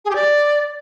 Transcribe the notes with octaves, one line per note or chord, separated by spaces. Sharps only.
G#4
G4
D5